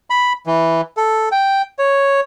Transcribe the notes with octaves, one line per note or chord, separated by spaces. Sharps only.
B5
E3
A4
G5
C#5